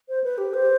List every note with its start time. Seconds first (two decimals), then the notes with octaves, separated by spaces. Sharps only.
0.09 C5
0.24 B4
0.38 G4
0.54 C5